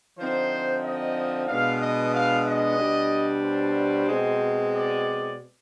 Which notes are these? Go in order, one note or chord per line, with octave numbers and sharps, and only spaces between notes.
D3 F3 C4 D#4 C5
D#5
B2 G#3 B3 D4 F5
D#5
F5
D#5
B2 G3 D4
C5
B2 G#3 C4
D5